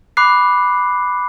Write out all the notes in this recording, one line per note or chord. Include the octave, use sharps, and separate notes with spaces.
B5 D6 F#6 C7